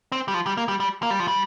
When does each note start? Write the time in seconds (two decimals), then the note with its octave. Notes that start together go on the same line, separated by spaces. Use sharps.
0.12 C4
0.28 G3
0.34 F3
0.47 G3
0.57 A#3
0.68 G3
0.80 G3
1.03 A#3
1.10 G3
1.20 F3
1.28 G3